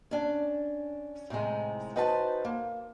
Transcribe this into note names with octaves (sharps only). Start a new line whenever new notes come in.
C#4 D4 G#5 A5
A2 C3 D#3 G#3
D#4 F#4 B4 C5 G#5 A5
A#3